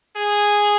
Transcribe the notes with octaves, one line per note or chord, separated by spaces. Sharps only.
G#4